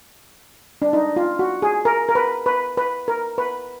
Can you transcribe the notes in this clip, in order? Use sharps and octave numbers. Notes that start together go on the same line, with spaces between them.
D4
D#4
F4
F#4
G#4
A#4
A#4
B4
B4
B4
A#4
B4